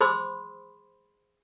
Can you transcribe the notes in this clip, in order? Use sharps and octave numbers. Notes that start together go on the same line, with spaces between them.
G#4 C5 B5 C6 D6 E6